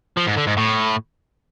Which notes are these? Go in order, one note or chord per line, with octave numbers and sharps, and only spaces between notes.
F3
G#2
D3
G#2
A2